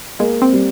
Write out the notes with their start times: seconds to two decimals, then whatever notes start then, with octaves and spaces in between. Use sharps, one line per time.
0.19 G#3 A#3
0.42 C4
0.53 G3